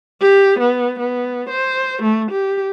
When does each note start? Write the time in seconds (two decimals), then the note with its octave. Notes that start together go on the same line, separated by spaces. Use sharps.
0.21 G4
0.59 B3
0.99 B3
1.50 C5
2.02 A3
2.31 G4